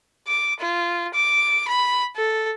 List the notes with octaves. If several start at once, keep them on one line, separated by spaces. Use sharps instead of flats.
D6
F4
D6
B5
A4